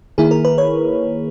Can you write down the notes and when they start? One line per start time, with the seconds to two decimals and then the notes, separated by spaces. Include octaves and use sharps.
0.18 D#3 A#3 E4 G#4
0.31 A#4
0.45 B4
0.58 C#5